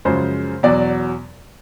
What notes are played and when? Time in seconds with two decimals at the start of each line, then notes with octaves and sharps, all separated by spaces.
0.05 F#2 C#3 F3 G#3 C5
0.63 E2 B2 F#3 D5